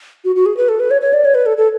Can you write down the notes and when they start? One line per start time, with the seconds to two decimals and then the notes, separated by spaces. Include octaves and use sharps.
0.24 F#4
0.36 F#4
0.46 G#4
0.57 B4
0.69 A4
0.80 B4
0.91 C#5
1.01 C#5
1.13 D5
1.25 C#5
1.35 B4
1.46 A4
1.58 A4